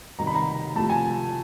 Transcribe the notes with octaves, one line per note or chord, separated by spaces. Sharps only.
C3 D#3 G3 A#5
B5
A#5
C3 F3 A3 A5
G#5